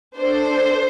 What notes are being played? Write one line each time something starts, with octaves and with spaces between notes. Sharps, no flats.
D4 A4 C5